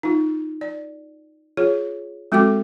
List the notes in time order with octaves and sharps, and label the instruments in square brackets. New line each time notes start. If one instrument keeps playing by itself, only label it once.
[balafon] D#4 F4
D5
F4 G#4 C#5
G#3 C4 F#4 A4 G5 D6